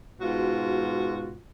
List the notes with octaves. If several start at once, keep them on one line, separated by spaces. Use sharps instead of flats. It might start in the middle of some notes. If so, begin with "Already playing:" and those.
G#2 B2 F4 F#4